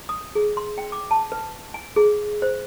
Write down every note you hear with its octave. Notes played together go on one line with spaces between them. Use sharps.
D#6
G#4
C6
G5
D6
A5
B4
G#5
G#4
C5